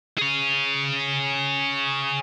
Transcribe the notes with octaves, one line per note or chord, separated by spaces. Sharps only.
G#4 C#5